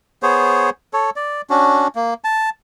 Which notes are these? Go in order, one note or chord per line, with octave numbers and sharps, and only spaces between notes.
B3 G#4 C5 C#5
A4 C#5
D5
C#4 D4 F#4
A#3
A5